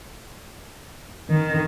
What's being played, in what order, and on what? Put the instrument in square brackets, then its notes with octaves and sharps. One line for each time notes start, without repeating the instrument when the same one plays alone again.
[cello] D#3